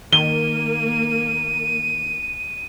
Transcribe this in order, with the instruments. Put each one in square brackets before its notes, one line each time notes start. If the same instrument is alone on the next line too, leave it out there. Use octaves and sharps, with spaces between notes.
[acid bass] D#3 [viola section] A#3 [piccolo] D#7 [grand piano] G7